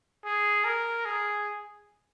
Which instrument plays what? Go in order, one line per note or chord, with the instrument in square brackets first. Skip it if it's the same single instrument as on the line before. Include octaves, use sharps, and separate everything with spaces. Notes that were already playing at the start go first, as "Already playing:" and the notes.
[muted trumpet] G#4
A#4
G#4